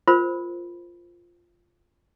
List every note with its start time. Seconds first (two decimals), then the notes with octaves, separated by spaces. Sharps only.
0.08 F4 A#4 C5 B5